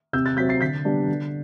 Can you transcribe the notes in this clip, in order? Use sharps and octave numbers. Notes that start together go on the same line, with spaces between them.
C3 E6 G6
F#6 A6
F#3 C4 G6 B6
A6 C7
D3 G6 B6
G3 B3 D4
D3